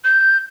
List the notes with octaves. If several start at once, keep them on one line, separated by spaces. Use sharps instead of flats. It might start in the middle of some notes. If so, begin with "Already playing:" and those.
G6